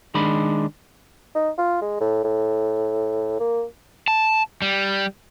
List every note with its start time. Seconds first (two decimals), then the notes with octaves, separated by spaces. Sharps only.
0.15 D#3 G#3 D4 B5
1.35 D#4
1.58 F4
1.82 G#3
2.00 A2
2.24 A2
3.40 A#3
4.08 A5
4.62 G3